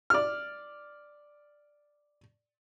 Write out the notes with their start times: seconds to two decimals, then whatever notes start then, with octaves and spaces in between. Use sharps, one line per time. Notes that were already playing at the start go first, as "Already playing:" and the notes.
0.10 D5 F6